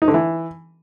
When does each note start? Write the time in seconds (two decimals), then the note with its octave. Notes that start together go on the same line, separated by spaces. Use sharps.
0.02 D#4
0.08 D3
0.14 E3